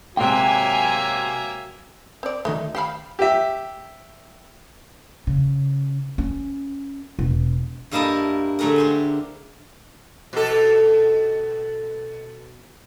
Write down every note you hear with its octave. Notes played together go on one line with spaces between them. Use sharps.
G#2 C3 F#3 A#3 E5 G5 G#5 F#6
C4 D5
D2 D#3 A3 D#4
G4 F5 F#5 B5 C7 E7
G4 E5
C#3
C#4
E1
G2 G3 A#3 E4 D#5 A5
D3 F#3 A3 G#4 A#4
G4 C5 G#5
B2 A4